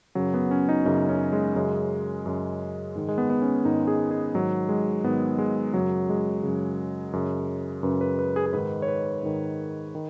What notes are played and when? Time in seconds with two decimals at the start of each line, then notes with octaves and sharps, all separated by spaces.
0.15 F#2 C#3 F#3
0.34 B3
0.51 C#4
0.69 D#4
0.86 F#2 C#3 D#4
1.09 C#4
1.33 G#3
1.56 F#2 C#3 G#3
2.26 F#2 C#3
2.96 G#2 D#3
3.09 G#3
3.18 B3
3.30 B3
3.42 C#4
3.65 G#2 D#3 D#4
3.87 G#4
4.11 G#4
4.34 G#2 D#3 F#3
4.69 G#3
5.04 G#2 D#3 B3
5.39 G#3
5.74 F#2 C#3 F#3
6.09 G#3
6.43 F#2 C#3
7.13 F#2 C#3
7.83 F#2 C#3 B4
8.01 B4
8.19 B4
8.36 G#4
8.46 G#4
8.53 G#2 D#3 B4
8.82 C#5
8.88 B4
9.23 G#2 D#3
9.95 D#3